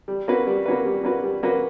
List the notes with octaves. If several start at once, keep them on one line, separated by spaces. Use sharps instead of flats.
G3
A#3 C#4 F#4 B4
G3
A#3 C#4 F#4 B4
G3
A#3 C#4 F#4 B4
G3
A#3 C#4 F#4 B4